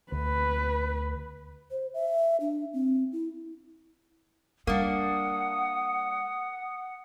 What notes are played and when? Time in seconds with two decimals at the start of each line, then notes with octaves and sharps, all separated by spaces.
0.12 D2 B4
1.70 C5
1.94 E5
2.41 D4
2.73 C4
3.12 E4
4.67 G3 A#3 D4 F#5 D#6